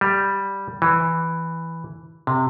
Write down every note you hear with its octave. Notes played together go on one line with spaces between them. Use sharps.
G3
E3
C3